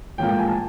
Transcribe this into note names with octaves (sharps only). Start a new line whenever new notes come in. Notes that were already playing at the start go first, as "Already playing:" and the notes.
A1 G#2 F3 A#3 G5
G5
G#5
A5